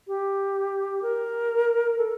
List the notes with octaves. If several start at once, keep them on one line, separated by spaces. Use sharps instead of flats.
G4
A#4
A4